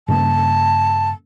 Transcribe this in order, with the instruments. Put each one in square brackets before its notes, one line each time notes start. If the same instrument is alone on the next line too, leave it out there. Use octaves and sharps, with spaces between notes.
[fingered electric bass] G2 C#3 A#3 [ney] A5